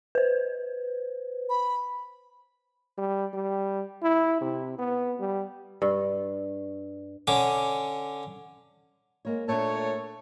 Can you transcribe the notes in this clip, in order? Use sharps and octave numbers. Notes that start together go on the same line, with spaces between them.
B4 C5
B5
G3
G3
E4
C3
B3
G3
G2
D3 C#4 D6
G#3 A#3 C#5
A#2 A3 A#3 D4 C#5